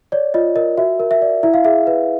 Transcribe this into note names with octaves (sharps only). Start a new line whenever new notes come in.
C#5 D5
F4 D#5
A#4 D#5
F#4 E5
A#4
E5
D5
E4 E5
F5
G#4 E5
B4